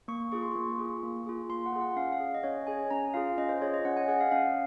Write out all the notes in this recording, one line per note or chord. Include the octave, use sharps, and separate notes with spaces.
A#3 C#6
F4 G#4 C#6
C6
A#3 C#6
F4 G#4
A#3
F4 G#4
A#3 C6
F#5
F4 G#4
F#5
C#4 F5
F5
G#4
D#5
C#4 C#5
G#4 G#5
C#4 A#5
F4 G#4 F5
C#4 D#5
C5
F4 G#4 C#5
D#5
C#4 F#5
G#5
G#4 F#5
F5
C#4 F5